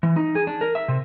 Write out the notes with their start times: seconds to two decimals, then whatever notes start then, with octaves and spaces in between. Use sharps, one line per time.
0.03 E3
0.16 D#4
0.35 G#4
0.47 D4
0.61 A#4
0.75 E5
0.88 C3